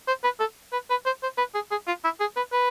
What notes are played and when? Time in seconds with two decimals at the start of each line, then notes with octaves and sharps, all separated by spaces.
0.08 C5
0.24 B4
0.40 A4
0.72 B4
0.90 B4
1.06 C5
1.23 C5
1.38 B4
1.54 G#4
1.71 G#4
1.87 F4
2.04 E4
2.20 G#4
2.37 B4
2.52 B4